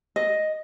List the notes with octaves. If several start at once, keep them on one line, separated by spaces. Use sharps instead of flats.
D#5